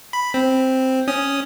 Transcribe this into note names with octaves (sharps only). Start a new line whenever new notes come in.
B5
C4
C#4 D#6